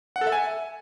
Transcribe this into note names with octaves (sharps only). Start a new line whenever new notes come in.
F#5
A4
E5
G#5